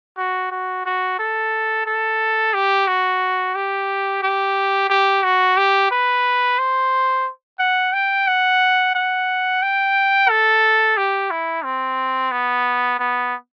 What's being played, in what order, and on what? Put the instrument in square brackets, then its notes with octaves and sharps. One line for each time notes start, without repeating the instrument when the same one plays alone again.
[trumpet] F#4
F#4
F#4
A4
A4
G4
F#4
G4
G4
G4
F#4
G4
B4
C5
F#5
G5
F#5
F#5
G5
A4
G4
E4
C4
B3
B3